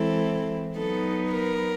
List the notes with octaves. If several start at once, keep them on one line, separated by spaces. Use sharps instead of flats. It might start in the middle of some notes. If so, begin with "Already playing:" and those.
Already playing: E3 G#3 C4 E4 A4
F#3 B3 D#4 A4
A#4